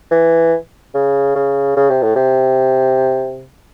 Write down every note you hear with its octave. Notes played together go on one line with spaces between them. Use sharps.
E3
C#3
C#3
C#3
C3
A2
C3